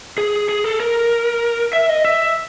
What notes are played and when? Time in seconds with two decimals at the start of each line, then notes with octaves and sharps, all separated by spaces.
0.18 G#4
0.49 G#4
0.64 A4
0.80 A#4
1.73 E5
1.89 D#5
2.05 E5